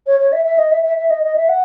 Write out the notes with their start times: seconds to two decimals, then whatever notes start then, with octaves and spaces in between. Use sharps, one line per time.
0.07 C#5
0.20 C#5
0.32 E5
0.45 E5
0.58 D#5
0.72 E5
0.84 E5
0.97 E5
1.10 D#5
1.23 D#5
1.36 E5
1.49 F#5